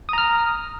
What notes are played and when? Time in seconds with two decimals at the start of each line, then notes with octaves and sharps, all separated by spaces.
0.09 D#6
0.13 A#5
0.18 F6